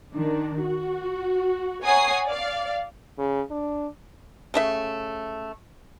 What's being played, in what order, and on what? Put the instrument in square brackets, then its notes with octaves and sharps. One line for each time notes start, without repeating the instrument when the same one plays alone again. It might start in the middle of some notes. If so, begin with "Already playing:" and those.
[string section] D#3 D4
F#4
C#5 F#5 G#5 A#5 D#6 C7
D5 F5
[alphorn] C#3
D4
[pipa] C#3 A3 E5